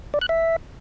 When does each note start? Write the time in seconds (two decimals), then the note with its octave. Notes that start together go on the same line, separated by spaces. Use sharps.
0.14 D5
0.21 F#6
0.29 E5